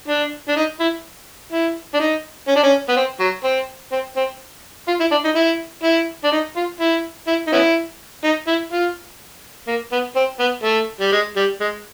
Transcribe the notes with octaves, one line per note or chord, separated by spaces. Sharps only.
D4
D4
D#4
E4
E4
D4
D#4
C#4
D4
C#4
B3
C4
F#3
C4
C4
C4
F4
E4
D4
D#4
E4
E4
D4
D#4
F4
E4
E4
D#4
B3 C#4 E4
D#4
E4
F4
A#3
B3
C4
B3
A3
G3
G#3
G3
G#3